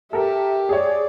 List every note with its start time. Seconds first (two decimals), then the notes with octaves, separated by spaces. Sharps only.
0.13 G4 A4 A#4 E5
0.69 G#4 C#5 D5